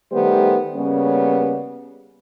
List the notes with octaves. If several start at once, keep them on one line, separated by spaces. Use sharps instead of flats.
D#3 G3 A3 B3 G4 C5
C#3 G3 A#3 B3 C#4